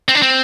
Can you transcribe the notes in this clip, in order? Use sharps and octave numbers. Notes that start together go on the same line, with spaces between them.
C4
D4
C4